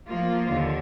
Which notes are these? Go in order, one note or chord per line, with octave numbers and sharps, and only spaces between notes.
F3 A#3 F4
D#2 D3